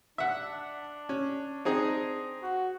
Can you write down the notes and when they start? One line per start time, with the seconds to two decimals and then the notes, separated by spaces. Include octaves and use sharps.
0.18 D4 E5 F#5
1.09 C#4
1.65 C4 D#4 G#4
2.42 F#4